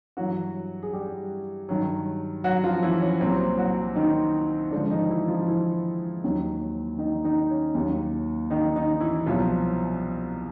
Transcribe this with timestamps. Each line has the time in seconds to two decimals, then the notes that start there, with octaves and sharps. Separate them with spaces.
0.17 G2 E3 F#3 F#4
0.83 G#4
0.93 G3 G4
1.69 G2 D#3 F#3
2.44 F#3 F#4
2.64 F3 F4
2.82 E3 E4
3.01 C#4
3.20 C2 A#2 F#3 C4
3.58 F#3 F#4
3.95 D#3 D#4
4.71 D3 F3 D4
4.75 G#2
4.90 D#3 D#4
5.10 E3 E4
5.28 F3 F4
5.48 E3 E4
6.24 D#2 D#3 F#3
6.99 D#3 D#4
7.24 D#3 D#4
7.50 C#4
7.75 D#2 D#3 F#3
8.50 D#3 D#4
8.76 D#3 D#4
9.01 E3 E4
9.26 C2 B2 F3 F#3 F4